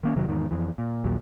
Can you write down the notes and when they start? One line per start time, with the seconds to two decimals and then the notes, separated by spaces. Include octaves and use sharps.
0.03 D#3 A#3 C#4
0.16 E1 C3 D#3 F#3
0.28 E2 G#2 D#3
0.51 F2 E3
0.78 A#2
1.04 A#1 D#2 A#2 F#3